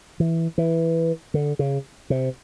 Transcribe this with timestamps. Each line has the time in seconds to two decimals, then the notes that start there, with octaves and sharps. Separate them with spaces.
0.20 E3
0.58 E3
1.34 D3
1.59 C#3
2.10 C3